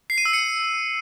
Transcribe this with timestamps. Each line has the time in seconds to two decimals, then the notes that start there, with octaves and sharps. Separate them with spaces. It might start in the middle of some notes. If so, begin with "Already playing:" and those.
0.10 C7
0.18 D#7
0.25 E6
0.33 C#7